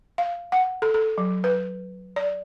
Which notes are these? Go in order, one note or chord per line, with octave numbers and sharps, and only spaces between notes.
F5
F#5
A4
A4
F#3
B4
D5